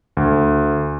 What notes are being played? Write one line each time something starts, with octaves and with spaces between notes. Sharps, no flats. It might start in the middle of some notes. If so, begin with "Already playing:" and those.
D2